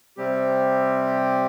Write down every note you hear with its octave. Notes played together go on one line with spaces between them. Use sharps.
C3 G3 C4 G4